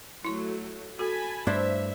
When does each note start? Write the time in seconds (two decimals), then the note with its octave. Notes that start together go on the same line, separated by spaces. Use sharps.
0.25 F#3 A3 E4 F#4 C#6
0.99 F#4 A4 G#5 A5 B5
1.47 G2 A3 D4 E4 C5 E5